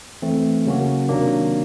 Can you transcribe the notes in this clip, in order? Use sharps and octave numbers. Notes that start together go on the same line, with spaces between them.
E3 A3 C4
C#3 F#3 A#3 C#4 F#4
C3 D#3 F#3 A#3 D4